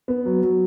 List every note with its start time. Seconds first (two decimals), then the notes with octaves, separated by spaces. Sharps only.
0.08 B3
0.25 F#3
0.43 F#3